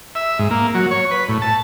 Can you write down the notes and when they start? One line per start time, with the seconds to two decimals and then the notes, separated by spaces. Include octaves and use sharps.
0.15 E5
0.39 G#2
0.51 A#3
0.75 F#3
0.91 C#5
1.11 B4
1.29 A2
1.42 A5